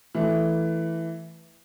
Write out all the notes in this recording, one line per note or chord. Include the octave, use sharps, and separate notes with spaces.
E3 A3